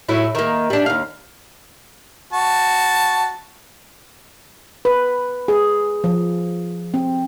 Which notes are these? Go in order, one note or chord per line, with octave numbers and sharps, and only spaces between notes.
A2 F#3 E4
D#3 A#3
G3 D4
D#2 F5
F#4 A5
B4
G#4
F3
C4